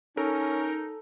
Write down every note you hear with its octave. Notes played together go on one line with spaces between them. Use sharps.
C#4 D#4 A4 A#4